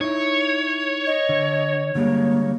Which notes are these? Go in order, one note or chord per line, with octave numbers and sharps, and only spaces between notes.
D#4 E4 C#5
D#5
D3
D3 G3 G#3 A#3